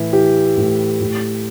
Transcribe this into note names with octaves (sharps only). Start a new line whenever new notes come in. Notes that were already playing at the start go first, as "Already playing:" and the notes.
Already playing: A2 E3 E4
E3 G4
A2
A2